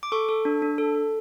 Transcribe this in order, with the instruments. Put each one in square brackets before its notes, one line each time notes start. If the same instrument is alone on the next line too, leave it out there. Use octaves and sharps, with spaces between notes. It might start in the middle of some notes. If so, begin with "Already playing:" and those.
[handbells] D6
A4 C#6
A4
D4
D4
A4
A4